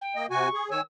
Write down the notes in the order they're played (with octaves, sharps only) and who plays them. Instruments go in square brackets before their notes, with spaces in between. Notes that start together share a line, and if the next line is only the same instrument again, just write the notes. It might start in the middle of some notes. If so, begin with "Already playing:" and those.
[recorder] G5
[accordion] A#3 D#5
[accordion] C3 F#4 G#5 [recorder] C#6
[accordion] G#4
[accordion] D#3 C#5 G#5 [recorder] E6